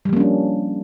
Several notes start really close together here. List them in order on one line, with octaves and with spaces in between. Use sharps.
G3 F3 A#3 C#4 D4